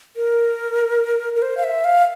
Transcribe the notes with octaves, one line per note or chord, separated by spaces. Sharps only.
A#4
A#4
C5
F5
E5
F5